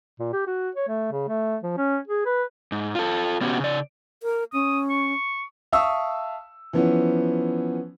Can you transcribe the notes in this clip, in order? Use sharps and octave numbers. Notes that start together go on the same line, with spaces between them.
A#2
G4
F#4
C#5
A3
C#3
A3
F3
C#4
G#4
B4
G#2
F4 A4
C3 B3 C#4 F#4 G4
C#3 D5
A#4
C#4 D#6
C#6
E5 F5 A5 C#6 D#6 E6
E3 F3 B3 C#4